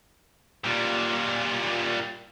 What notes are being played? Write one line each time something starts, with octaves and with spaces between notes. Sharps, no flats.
A#2 G3